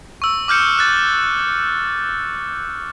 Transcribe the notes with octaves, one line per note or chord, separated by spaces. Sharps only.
C#6 E6
D6 F6 G6 C#7
F#6 A6